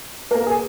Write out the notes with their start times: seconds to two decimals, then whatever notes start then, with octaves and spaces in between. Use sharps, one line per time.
0.31 A#3 A#4
0.47 G#4